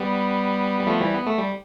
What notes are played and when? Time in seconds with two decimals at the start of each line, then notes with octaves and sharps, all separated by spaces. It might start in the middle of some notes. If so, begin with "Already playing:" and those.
Already playing: G3 B3
0.80 G3
0.86 F3 A3
1.00 E3 G3
1.14 B3
1.26 A3
1.38 G3